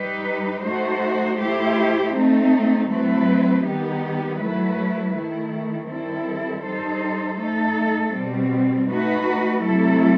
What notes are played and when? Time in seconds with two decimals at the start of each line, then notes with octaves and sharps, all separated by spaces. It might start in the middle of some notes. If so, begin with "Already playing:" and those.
Already playing: G3 D#4 G4 B4
0.63 A3 D#4 F#4 C5
1.38 A3 E4 G4 C5
2.13 A3 C4 D#4
2.88 F#3 A3 C4 E4 B4
3.63 D#3 G3 B3 D#4 G4
4.38 F#3 A3 E4 B4
5.13 D#3 A3 E4
5.89 D#3 G3 C4 E4 A4
6.63 G3 D#4 A4 C5
7.39 A3 D#4 A4
8.14 B2 G3 C4
8.89 A3 D#4 F#4 B4
9.63 C3 F#3 A3 E4 A4